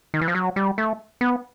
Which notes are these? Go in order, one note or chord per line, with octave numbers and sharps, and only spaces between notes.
D#3
E3
F3
F#3
G3
A3
B3